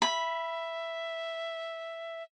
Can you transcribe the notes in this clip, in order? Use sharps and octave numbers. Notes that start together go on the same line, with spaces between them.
E5 B5